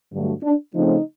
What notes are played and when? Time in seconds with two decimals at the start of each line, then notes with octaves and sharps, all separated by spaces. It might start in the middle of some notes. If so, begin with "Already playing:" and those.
0.11 G2 D3 F#3 A3
0.43 D4
0.73 C#3 F3 A3 C4 D#4